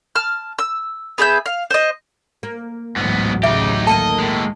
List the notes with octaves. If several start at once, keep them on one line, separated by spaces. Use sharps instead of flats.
A5 F6
E6
B3 G#4 E5 G6
F5
C5 D#5
A#3
A1 D2 G#2 F#3 B3
C#3 D#4 G4 E5
D#3 A#3 A4 D#5 A5
A2 G#3